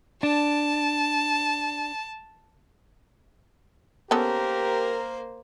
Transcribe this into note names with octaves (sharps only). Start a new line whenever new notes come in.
D4 A5
A#3 B3 C#4 G4 A4 A#4 C5